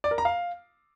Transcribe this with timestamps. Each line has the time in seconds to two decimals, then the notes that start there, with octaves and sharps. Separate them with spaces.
0.04 D5
0.11 A#4
0.18 A#5
0.25 F5